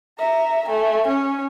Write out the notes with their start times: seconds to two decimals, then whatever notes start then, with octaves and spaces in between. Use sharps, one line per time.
0.19 E5 A#5
0.68 A3 G#5
1.07 C#4